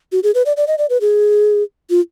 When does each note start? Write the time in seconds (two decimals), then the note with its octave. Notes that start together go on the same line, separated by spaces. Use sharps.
0.12 F#4
0.23 G#4
0.35 B4
0.46 D5
0.57 D5
0.67 D#5
0.78 D5
0.90 B4
1.01 G#4
1.90 F4